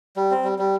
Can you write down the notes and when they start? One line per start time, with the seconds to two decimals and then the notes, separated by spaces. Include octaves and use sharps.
0.16 G3
0.31 C4
0.44 G3
0.59 G3